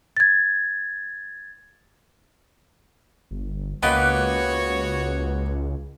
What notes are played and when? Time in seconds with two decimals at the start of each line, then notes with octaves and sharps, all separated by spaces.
0.17 G#6 A6
3.31 G1
3.83 C#2 A#3 B3 F#4 G4 B4 C#5 D#5